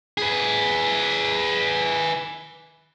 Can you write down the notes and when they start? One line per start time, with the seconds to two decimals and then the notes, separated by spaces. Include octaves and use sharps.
0.18 G#4 B4